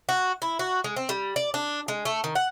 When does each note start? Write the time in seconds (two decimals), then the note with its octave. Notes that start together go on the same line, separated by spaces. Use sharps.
0.09 F#4
0.42 E4
0.59 F#4
0.84 G#3
0.96 C4
1.09 G3
1.36 D5
1.54 D4
1.88 G#3
2.05 A3
2.24 D#3
2.35 F#5